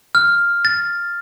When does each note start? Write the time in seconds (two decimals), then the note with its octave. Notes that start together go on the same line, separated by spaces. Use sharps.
0.15 F6
0.65 A6